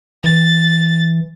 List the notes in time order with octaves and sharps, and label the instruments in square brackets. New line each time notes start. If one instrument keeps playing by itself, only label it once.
[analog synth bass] E3 [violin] A6